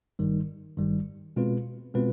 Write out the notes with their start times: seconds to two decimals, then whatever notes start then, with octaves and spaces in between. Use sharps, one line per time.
0.19 G#1 G2 D#3 G3
0.77 G#1 G2 D#3 G3
1.36 B2 G#3 C4 F4 B4
1.94 B2 G#3 C4 F4 B4